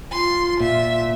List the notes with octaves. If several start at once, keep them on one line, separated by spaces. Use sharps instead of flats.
F4 C6
A#2 E5